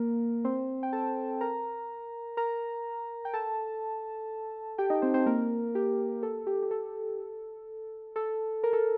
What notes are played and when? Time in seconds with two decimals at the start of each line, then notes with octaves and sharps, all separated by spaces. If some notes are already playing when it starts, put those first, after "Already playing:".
Already playing: A#3 A#4
0.45 C4 C5
0.83 G5
0.93 A4 A5
1.41 A#4 A#5
2.37 A#4 A#5
3.25 G5
3.33 A4 A5
4.78 G4 G5
4.90 D#4 D#5
5.02 C4 C5
5.14 C4 C5
5.26 A#3 A#4
5.75 G4
6.23 A4
6.47 G4
6.63 G4
6.71 A4
8.16 A4
8.64 A#4
8.73 A4